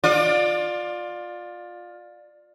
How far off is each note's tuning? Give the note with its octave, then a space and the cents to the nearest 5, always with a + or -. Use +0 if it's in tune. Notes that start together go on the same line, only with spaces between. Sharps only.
F4 +20 D5 +20